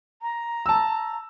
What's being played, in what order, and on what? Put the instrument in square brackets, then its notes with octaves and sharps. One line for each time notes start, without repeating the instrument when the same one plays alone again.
[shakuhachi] A#5
[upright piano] A5 E6